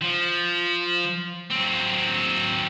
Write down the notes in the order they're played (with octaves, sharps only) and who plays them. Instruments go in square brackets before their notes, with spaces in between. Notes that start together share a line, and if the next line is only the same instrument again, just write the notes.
[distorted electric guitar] F3
F#3 C4